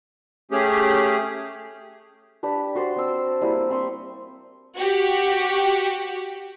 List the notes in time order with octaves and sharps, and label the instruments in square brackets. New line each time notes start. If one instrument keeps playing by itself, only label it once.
[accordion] A3 C#4 G4 G#4
[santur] D4 G4 B4
F#4 C5 D5 C6
C4 E6
G3 A#3 E4 G4
C4 C6 C#6 D#6
[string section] F#4 G4